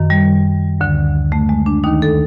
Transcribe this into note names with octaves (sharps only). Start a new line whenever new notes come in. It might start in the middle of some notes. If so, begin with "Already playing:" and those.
Already playing: F#2 D#3
G3
D2 D3
A3
G#3
D4
D#2 D#3 D#4
A4